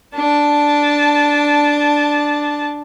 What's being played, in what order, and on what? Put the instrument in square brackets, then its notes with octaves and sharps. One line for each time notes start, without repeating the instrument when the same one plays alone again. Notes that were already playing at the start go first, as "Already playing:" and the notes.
[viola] D4 A5